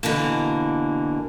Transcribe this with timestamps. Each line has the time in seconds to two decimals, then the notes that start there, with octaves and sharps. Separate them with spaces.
0.03 B2 D3 E3 A#3